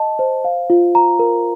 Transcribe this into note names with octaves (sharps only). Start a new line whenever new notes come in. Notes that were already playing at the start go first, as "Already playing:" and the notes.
Already playing: D#5 A5
C5
F5
F4
A#5
A#4